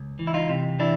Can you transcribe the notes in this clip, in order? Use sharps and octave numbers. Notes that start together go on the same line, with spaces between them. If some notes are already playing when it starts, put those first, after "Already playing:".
Already playing: C#2
E3
E4
D#4 F4
C3
E3 D4 E4